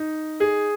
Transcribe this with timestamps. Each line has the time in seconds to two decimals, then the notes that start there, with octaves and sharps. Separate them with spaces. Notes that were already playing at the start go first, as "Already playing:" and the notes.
Already playing: D#4
0.40 G#4